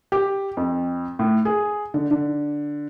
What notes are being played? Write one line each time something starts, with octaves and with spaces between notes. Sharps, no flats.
G4
F2
A2
G#4
D3
D3